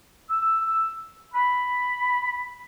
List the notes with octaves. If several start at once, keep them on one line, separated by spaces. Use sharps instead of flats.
E6
B5